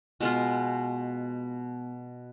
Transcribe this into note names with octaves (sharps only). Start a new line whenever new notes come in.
B2 G#3 B3 F4